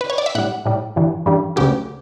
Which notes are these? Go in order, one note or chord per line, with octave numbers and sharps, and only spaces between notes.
B4
C#5
D5
E5
A2 G3 F#5
A2 G3
G2 E3 G3
G2 E3 G3
D2 C#3 F#3 G4